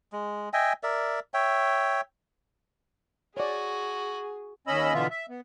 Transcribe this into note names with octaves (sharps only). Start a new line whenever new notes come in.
G#3
D#5 E5 G5 G#5
A#4 D5 E5
C#5 E5 G5
F#4 G#4 C#5 D5 G#5
D#2 C#4 D#5 B5 E6
B2 D3 E3 B3 F4 E5
E5
B3